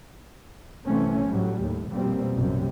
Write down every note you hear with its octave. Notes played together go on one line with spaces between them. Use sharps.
C2 E3 A3 C4 C#4
A2 F#3 G3
D#2 A2
F2 B2 G3 A#3 C4
A#1 F#2 C3 G3